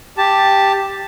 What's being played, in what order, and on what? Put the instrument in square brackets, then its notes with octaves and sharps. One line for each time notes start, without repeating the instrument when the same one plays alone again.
[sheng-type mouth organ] G4 A5